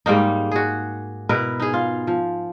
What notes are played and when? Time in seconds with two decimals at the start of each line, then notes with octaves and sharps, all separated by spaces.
0.06 G#2 G3 A#3 D#4
0.51 F#4 G#4
1.29 B2 E4 A#4 B4
1.60 D#4 G#4
1.74 F4
2.07 F3